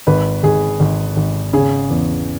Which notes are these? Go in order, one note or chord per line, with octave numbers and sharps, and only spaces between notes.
G#1 B4
G#1 G#4
G#1
G#1
C#3 G#4
E2